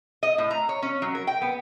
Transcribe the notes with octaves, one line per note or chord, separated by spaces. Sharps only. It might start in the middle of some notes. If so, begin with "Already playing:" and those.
D#5
A2
A#5
C#5
C#4
F#3
A#4
G5
B3